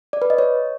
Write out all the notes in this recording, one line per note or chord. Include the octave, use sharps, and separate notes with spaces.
D5
B4
D#5
C#5